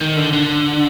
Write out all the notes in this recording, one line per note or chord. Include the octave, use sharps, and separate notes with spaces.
D#3
D3
D3